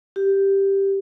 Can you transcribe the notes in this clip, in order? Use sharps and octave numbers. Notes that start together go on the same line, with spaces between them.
G4